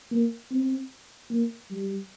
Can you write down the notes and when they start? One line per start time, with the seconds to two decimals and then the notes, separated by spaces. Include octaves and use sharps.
0.11 A#3
0.51 C4
1.31 A#3
1.70 G3